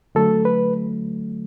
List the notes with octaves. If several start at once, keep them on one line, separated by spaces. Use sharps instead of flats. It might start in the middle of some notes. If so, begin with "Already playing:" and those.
D3 F#3 A3 A4
B4